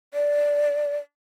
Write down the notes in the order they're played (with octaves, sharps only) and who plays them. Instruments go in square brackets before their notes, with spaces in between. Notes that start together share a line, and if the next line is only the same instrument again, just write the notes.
[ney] D5